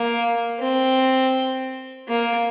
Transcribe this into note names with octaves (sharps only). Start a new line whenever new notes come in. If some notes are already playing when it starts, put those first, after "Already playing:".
Already playing: A#3
C4
A#3